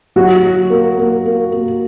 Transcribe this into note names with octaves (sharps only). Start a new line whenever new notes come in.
F#3 F#4
F#3
A#3
A#3
A#3
A#3